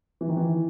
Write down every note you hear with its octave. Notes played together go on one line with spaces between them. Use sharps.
E3
D#3
E3